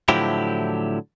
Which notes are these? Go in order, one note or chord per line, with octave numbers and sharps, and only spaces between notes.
A2 D3 F3 F#3 E4 G4